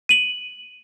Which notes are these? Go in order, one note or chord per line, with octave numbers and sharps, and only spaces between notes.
D#7 F#7